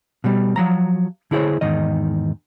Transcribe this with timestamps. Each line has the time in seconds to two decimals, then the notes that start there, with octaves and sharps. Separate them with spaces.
0.24 B2 G3
0.56 F3 F#3 A#5
1.31 D3 E4 G#4 C5 C#5
1.61 E2 G#2 D#3 D#5